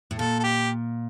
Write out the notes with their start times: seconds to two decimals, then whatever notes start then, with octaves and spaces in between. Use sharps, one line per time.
0.11 A2
0.19 A#2 A4
0.39 A4
0.43 G4